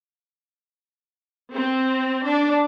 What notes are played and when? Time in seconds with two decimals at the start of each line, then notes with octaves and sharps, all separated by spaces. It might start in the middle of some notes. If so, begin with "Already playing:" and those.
1.53 C4
2.27 D4